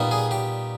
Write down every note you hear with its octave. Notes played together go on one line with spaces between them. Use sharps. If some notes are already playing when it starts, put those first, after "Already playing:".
Already playing: A#2 G3 B3 D#4
G#4
G4